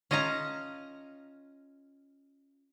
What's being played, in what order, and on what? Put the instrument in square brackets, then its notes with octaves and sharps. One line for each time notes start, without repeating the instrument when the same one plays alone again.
[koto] C#4 F4 D#5 A5 A#5